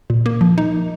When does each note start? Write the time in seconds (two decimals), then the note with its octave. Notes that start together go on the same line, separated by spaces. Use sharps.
0.10 A#2
0.26 A#3
0.41 F3
0.58 D#4